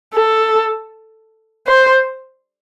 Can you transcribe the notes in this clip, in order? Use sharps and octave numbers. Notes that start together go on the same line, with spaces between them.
A4
C5